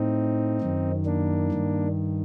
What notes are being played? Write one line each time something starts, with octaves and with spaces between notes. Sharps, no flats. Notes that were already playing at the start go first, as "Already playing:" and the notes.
Already playing: A2 C4 D#4
F#2 D#3
A#3 D4
G2 D#3